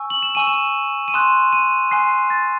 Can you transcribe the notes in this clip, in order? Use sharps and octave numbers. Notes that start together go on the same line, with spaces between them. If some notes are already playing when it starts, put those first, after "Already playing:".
Already playing: G#5 C#6 E6
F#7
E7
G#5 C#6 E6 D#7
E7
D#7
G#5 C6 D#6 F#6 E7
D#7
G#5 C6 D#6 F#6 C7
A6